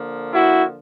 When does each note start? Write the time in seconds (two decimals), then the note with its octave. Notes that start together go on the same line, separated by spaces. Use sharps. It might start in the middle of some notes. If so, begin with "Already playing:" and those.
Already playing: D3 F3 A#3
0.32 E4 F#4